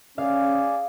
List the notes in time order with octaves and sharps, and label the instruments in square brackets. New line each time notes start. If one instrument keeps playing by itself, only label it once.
[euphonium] C#4 [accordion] G#4 D5 [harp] F5